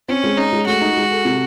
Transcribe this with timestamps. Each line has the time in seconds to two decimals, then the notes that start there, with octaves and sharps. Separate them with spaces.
0.09 C4 C#4
0.24 G#3
0.37 C#4 D#4
0.53 G#3
0.67 A3 F#4
0.81 D#4
0.97 G#3
1.11 A4
1.25 C3